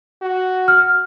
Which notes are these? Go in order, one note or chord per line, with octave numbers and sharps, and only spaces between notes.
F#4
F6